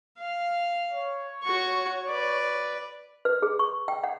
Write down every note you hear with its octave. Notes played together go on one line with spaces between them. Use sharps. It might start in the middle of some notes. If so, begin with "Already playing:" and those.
F5
C#5
F#4 C#6
B4 D5
B4
G#4
C#6
G5
F#5